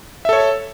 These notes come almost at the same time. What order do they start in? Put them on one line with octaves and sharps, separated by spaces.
E5 A4 C#5